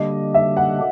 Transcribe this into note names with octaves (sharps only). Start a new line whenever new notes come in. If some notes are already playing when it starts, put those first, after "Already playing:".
Already playing: D3 G3 A#3 D4 G4 D#5
E5
F#5